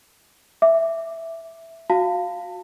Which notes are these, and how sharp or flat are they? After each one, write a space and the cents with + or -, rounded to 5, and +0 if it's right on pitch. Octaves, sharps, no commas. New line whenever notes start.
E5 +0 D6 +0
F#4 -15 F5 +0 A5 +25